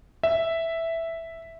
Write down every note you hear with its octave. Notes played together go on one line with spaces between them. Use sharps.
E5